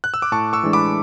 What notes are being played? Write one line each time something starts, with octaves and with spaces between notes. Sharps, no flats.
F#6
E6
D6
A2 A5 C#6
C#6 E6
E3 G#3 D4
B5 D6